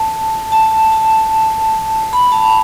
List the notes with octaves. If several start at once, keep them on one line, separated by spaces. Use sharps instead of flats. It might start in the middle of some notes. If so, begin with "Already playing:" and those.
Already playing: A5
A5
A5
B5
A5